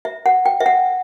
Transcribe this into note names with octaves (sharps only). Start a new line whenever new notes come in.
E5
F#5
G5
E5
F#5